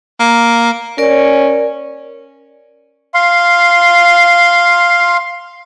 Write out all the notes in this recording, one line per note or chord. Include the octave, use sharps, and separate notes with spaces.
A#3
C#4 A#4 D5
F5 C6